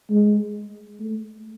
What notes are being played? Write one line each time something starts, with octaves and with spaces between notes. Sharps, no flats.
G#3
A3